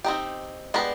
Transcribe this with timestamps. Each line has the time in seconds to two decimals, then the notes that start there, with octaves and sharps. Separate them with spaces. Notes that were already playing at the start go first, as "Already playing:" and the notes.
0.04 C4 D#4 G4
0.74 G#3 B3 D4 G4 B4